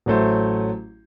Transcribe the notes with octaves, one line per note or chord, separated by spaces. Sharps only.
A1 F#3 A3 C5